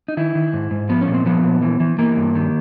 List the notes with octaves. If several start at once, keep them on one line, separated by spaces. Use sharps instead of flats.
D#4
D#3 E4
D#3
G#2
G#2
F3 B3
C#4
A#2
C4
F3 B3
A#2
E3
E3
E3 A#3
G2
D#3